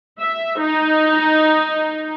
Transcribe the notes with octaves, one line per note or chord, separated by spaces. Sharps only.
E5
D#4